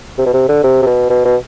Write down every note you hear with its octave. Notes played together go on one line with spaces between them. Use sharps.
C3
B2
C3
D3
C3
C3
B2
B2
B2